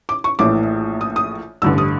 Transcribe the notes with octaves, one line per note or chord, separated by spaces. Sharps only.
D6
C#6
A#1 A2 E3 D6
D#6
D#6
A1 G2 D3 E6
D#6